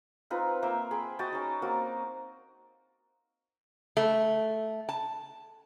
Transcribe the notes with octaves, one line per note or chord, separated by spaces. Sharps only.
C4 D#4 F4 B4
A#3 C5 E5 G5
G#4 G5 B5 C6
F#4 D#5 G5 A5
C#4 D#4
A#3 C4 F#4
A3
A5